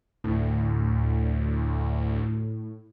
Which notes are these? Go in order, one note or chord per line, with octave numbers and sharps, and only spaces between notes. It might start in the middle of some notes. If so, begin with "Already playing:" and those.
D2 A2